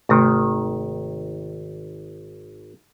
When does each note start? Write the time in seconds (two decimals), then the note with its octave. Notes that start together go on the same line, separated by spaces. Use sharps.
0.09 G#1 C3 D#3 A3 C6